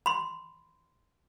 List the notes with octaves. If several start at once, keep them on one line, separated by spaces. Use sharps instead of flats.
B5 C6